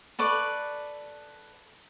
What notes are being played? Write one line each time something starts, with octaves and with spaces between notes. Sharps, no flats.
A4 B4 D5 C#6